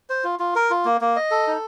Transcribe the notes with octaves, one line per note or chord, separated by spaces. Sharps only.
C5
F4
F4
A#4
F4
A#3
A#3
D#5
A4
D#4